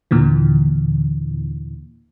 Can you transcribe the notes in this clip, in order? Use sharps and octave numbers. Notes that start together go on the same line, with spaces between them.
D#2 A#2 D3 E3